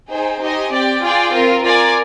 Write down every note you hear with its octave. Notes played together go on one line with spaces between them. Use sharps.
D#4 G#4 C5 G5
D#4 G4 C5 D#5 G#5
C4 G4 D5 G5
F4 G#4 D5 G5
C4 F4 A#4
F4 A#4 D5 G#5